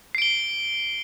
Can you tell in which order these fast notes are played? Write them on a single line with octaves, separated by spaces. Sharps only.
C7 D7 G7